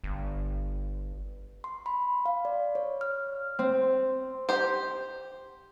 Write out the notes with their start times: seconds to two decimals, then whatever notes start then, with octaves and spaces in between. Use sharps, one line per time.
0.04 G1
1.64 C6
1.86 B5
2.26 F5
2.45 D5
2.75 C#5
3.01 F6
3.59 C4
4.49 G4 C5